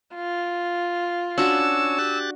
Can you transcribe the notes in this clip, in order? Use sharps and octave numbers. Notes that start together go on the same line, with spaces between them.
F4
C#4 D4 F#4 C#5 A5 E6
G4 F#6 A6